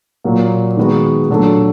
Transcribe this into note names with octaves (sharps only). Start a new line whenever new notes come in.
A#2 F#3 A#3
D#3 G#3 B3 D#4 F#4
A#2 F#3 A3 D4